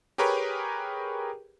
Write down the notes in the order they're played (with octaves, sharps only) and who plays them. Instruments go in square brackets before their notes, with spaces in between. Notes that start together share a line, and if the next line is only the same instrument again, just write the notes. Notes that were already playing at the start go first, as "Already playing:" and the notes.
[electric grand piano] G4 G#4 A#4 B4 C#5 G5